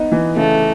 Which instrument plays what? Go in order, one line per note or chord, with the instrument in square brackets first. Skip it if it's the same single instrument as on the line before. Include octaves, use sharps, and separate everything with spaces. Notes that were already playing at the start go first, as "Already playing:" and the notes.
Already playing: [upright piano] B3 D#4
E3
[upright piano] C#3 [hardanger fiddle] A3